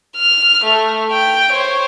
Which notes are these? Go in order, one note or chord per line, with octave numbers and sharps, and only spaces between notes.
F6
A3
G5
C5 C#5